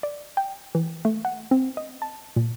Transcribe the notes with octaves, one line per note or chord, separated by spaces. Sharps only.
D5
G5
E3
A3
F#5
C4
D#5
A5
A#2